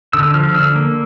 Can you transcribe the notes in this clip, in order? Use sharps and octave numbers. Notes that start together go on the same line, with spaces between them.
D3 E6
F3 F6
D3 E6
A#3